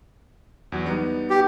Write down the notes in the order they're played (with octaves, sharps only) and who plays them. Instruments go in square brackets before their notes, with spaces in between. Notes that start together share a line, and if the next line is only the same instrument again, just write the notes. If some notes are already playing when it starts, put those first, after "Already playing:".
[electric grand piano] E2 F#3
G3 B3 D#4
[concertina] G4